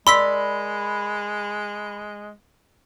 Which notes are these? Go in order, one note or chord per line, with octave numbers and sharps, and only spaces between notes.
G#3 A#4 D5 B5 C6 E6 B6